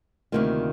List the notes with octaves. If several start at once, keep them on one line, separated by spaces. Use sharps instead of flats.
D2 C3 D#3 A#3 F4